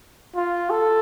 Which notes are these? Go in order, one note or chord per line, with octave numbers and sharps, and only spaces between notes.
F4
A4